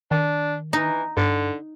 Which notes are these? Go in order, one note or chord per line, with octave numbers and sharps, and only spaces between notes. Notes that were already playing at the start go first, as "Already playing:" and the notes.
D#3 D4
E3 D#4
G2 D3